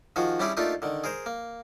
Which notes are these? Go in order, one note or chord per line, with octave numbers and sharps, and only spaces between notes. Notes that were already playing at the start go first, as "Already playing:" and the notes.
D#3 F3 F#4 G#4
G3 C#4 D4 E4 G4 G#4
A3 A#3 D4 D#4 F4 G4
D3 D#3
G#4 A#4 C5
A#3